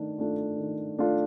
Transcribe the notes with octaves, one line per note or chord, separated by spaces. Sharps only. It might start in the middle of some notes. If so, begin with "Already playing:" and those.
Already playing: D#3 A3 D4
A3 D4 F4
D#3
A3 D4 F4